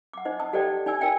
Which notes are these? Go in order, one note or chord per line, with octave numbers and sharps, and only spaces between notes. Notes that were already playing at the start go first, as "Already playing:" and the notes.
F#5 D6
D#4 C5 D#5
D#5 A5 D#6
G4 A4 C5 D5 D#5 G5
D#4 D5 G#5 E6
D#4 A#4 D5 G5 G#5